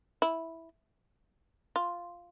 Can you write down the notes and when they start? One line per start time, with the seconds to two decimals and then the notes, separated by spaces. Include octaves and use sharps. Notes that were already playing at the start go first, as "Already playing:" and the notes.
0.22 E4
1.76 F4